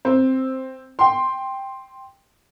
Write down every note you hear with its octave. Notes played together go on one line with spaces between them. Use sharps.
C4
G5 C6